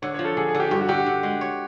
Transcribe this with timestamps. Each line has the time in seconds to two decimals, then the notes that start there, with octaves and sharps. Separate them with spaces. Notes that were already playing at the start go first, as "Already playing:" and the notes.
0.02 D3 C#5
0.14 C#5
0.19 F3
0.25 A4
0.37 D3 G#4
0.49 G#4
0.55 D3
0.60 G4
0.71 G2 G4
0.81 F#4
0.89 D3 G4
1.06 D3
1.23 G#3
1.41 C#5